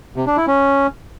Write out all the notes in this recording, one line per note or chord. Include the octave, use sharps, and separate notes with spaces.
C3
D4
E4
C#4